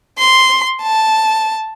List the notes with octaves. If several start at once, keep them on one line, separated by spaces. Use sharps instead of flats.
C6
A5